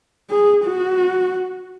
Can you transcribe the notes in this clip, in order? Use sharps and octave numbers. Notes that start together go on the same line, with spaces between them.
G#4
F#4